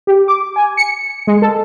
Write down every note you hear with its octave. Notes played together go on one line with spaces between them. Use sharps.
G4
D6
G#5
C#7
G#3
A4